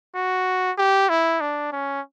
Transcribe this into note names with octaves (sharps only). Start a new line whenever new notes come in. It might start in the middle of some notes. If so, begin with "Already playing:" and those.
F#4
G4
E4
D4
C#4